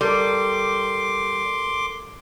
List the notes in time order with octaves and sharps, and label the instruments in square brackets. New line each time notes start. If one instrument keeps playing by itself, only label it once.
[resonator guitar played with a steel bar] G3 [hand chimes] A4 A#4 [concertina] C6 D6